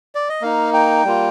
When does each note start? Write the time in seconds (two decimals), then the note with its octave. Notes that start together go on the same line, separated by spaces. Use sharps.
0.15 D5
0.29 D#5
0.42 A#3 D#4 F5
0.74 G5
1.04 G3 A#3 F4